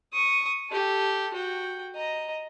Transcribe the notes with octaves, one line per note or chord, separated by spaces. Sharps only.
C#6 D#6
G4 A4
F#4 G5
D#5 A#5